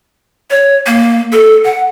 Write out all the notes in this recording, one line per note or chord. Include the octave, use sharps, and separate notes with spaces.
C#5
A#3
A4
F#5